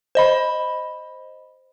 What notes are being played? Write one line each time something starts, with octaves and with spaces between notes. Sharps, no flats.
C5 D#5 B5